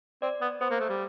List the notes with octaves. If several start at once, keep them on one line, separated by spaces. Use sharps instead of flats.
C4 D5
B3
B3 C5
A#3
A3
G3